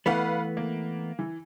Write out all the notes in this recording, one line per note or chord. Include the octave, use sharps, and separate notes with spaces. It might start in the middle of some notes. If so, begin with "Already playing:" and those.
E3 A3 B3 B4 F5 F#5
A#3
E3